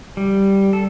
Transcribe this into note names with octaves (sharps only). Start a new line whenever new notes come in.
G3
A4